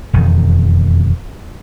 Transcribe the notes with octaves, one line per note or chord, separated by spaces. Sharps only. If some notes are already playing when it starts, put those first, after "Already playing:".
E1 F2 D#3